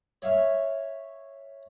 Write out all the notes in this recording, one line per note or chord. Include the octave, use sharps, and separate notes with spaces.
C#5 E5 F5 C#6